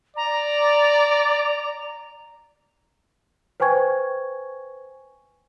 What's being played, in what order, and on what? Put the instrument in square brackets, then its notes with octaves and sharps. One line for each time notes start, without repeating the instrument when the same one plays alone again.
[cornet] D5 [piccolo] A#5
[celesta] B4 C5 G5 G#5 C#6 G#6